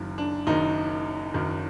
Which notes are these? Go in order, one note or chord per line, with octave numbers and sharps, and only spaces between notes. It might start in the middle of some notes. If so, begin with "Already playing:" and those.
Already playing: F#1 F#2 D#3
D4
F#1 F#2 D#3 D#4
F#1 F#2 D#3